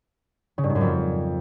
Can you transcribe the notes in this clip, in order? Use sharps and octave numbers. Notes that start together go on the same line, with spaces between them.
C#3
G2
G#2
F#2
F2